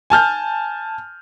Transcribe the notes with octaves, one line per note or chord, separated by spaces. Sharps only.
G#5 A5 F6 G6